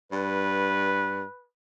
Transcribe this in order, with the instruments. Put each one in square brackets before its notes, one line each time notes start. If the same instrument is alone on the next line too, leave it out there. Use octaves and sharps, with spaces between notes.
[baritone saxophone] G2 [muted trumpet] B4